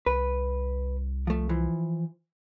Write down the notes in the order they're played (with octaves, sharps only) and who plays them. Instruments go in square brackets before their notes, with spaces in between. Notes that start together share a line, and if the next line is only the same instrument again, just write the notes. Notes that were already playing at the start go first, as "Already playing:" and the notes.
[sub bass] C2 [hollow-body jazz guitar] B4
[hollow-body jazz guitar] F3 A3
E3 F3